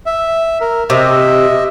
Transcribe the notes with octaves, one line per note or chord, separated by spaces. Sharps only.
E5
A#4
C3 D#5 E5